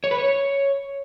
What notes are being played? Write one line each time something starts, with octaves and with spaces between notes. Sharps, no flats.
C#5
B4
C#5